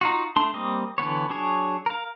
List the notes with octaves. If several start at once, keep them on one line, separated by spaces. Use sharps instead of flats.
D#4 F4 F#4
A3 D4 C6
G3 A#3 C4 D#5
D3 E3 B3 C#5
F#3 D4 G#4 C#5
A#4 F5